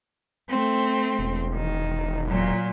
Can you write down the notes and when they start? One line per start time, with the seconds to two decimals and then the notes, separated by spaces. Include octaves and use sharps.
0.50 A3 C4
1.19 E1
1.53 D#3
2.27 A#2 F#3